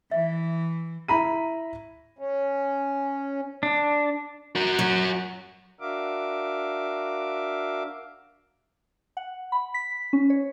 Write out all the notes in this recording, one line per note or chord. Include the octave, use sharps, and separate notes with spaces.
E3 E5
E4 A#5 B5 D#7
C#4
D4
F#4 A#4
F#3
D4 F#4 A#4 E5 F5 D6
F#5
B5
B6
C#4
C#5